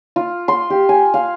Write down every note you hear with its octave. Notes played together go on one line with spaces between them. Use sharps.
F4
C6
G4
G#5
F5